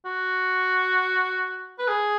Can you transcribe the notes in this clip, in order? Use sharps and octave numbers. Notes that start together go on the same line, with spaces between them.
F#4
B4
G#4